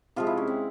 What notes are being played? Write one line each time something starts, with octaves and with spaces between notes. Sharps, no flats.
C3 F3 G#3 F4
E4
C#4
C4